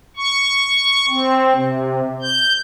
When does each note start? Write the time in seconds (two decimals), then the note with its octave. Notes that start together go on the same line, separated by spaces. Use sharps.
0.17 C#6
1.09 C4
1.54 C3
2.22 G6